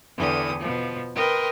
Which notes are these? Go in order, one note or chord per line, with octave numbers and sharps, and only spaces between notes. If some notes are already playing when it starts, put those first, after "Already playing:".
E2 D3 E3 G4 D#6
B2 F3
A#4 B4 D#5 G5 C6